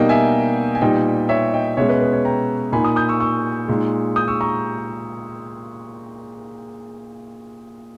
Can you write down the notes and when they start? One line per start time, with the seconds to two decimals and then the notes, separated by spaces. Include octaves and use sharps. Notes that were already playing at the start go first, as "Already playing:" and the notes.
Already playing: B2 G3 A#3 D#4 D#5 G5
0.09 E5 G#5
0.75 G#5
0.81 A#2 G3 B3 D#4 D#5 G5
1.29 C#5 E5
1.54 D#5 G5
1.77 B2 G#3 C#4 C#5 E5
1.89 B4 D#5
2.00 B4
2.13 C#5
2.25 G5 A#5
2.72 A#2 A#3 D#4 G#5 B5
2.84 B5 D#6
2.96 D#6 G6
3.09 C#6 E6
3.20 C#6 E6
3.68 A#2 G#3 D#4
4.16 D#6 G6
4.28 C#6 E6
4.41 A#5 C#6